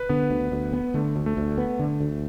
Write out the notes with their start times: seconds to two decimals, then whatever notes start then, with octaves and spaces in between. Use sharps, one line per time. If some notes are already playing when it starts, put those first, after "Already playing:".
Already playing: B4
0.09 D3 B3
0.30 D2
0.52 D2
0.73 B3
0.94 D3 A3
1.16 D2
1.26 A3
1.37 D2
1.58 B3
1.79 D3
2.00 D2